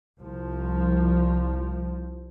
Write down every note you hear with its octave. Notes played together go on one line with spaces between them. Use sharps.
C2 F3